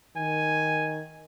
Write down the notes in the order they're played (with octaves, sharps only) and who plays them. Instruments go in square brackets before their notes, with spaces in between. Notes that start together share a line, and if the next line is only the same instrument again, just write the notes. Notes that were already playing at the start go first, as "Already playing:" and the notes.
[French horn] D#3 [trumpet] G#5